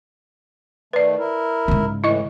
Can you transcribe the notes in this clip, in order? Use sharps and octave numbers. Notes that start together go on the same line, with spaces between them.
D#3 A3 B4 D5
E4 A#4
G#2 C#3
A2 E3 E4 D#5 C#6